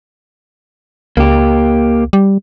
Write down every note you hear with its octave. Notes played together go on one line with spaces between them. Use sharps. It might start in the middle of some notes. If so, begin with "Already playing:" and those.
C#2 A#3 G4
G3